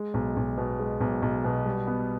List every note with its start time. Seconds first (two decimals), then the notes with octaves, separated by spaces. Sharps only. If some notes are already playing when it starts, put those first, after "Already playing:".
Already playing: G#3
0.14 B1
0.36 B1
0.58 B2
0.79 G#3
1.00 B1
1.22 B1
1.44 B2
1.65 G3
1.87 B3